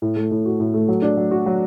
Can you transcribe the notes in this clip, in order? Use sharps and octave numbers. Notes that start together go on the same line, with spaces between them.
A2
A3
A2
F#4
A2
A3
F#3
D4
F#3
F#4
F#3